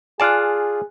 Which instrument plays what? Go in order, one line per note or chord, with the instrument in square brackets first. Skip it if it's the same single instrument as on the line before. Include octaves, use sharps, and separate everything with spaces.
[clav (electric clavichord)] F4 D5 A5 [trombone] G#4 [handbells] G#5 F6 F#6